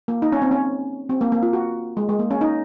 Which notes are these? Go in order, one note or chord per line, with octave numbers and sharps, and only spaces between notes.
A#3
D#4
C#4
C4
C#4
C4
A#3
A#3
F4
F#4
G#3
G#3
A#3
C#4
D#4